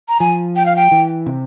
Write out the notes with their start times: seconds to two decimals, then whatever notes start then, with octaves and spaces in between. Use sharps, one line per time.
0.08 A#5
0.20 F3 G#5
0.56 G5
0.66 F5
0.76 G5
0.91 E3
1.26 C3